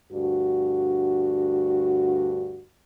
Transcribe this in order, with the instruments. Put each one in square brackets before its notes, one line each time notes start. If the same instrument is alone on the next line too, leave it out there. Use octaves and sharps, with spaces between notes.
[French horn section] D2 G2 D4 F#4